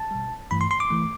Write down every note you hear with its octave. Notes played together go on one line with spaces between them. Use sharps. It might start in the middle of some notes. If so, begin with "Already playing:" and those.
Already playing: A5
B2 G3
G2 E3 A3 B5
C6
C6
D6
E3 A3